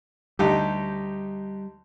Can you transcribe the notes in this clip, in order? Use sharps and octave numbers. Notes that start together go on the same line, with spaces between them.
D2 G3 D#4 G4